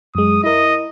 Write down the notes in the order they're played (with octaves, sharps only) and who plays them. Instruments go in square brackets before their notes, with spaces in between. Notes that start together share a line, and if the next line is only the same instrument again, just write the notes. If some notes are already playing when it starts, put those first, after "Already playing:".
[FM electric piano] F#2 G#3 [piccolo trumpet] D#6
[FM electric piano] E4 A#4 [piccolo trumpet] D#5